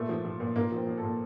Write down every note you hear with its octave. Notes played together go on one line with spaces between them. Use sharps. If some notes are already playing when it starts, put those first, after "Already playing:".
Already playing: A#2 A3
F3
F3
A#2
A#2 A#3
F3 C4
F3
A#2 A4